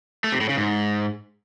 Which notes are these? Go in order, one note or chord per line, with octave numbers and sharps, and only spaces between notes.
A3
C3
A2
C#3
G#2